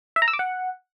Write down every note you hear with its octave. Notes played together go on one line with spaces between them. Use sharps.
E5
A#5
E6
D6
F#5